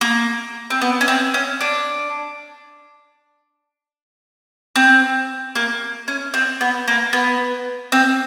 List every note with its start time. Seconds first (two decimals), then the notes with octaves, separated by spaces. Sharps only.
0.01 A#3
0.70 C4
0.81 B3
1.01 C#4
1.08 C4
1.34 C#4
1.61 D4
4.76 C4
5.55 A#3
6.08 C#4
6.34 C4
6.61 B3
6.88 A#3
7.13 B3
7.92 C4